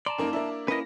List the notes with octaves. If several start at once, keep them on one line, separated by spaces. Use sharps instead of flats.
D5 A5 A#5 C6
F#2 A#3 D#4
A#3 D4 E4
A#3 C#4 E4 B4 D#5 A#6